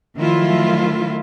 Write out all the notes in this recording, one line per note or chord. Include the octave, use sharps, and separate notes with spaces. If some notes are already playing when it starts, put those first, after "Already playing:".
D#3 F3 F#3 A3 E4 F4